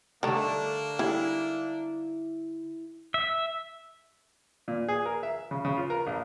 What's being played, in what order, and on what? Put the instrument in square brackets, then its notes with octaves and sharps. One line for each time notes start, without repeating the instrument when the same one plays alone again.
[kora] D3 A3 A4 [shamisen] G3 D#4 [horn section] A#3 D4
[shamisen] G3 [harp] E4 [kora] G#4
[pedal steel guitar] E5
[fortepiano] A#2
G#4
A#4
E5
C#3
C#3
F4
A#4
A#1